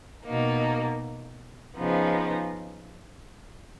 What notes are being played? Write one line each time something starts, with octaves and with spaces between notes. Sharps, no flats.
B2 A#3 D#4
C#3 F3 B3 D#4